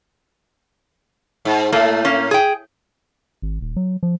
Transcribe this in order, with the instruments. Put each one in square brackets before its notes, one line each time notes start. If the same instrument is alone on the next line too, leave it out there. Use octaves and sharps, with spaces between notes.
[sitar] G#2
[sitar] A2 [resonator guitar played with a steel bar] A3 A#3
[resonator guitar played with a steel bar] A#3 C#4
G#4 G5
[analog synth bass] G#1
D#1
F#3
F3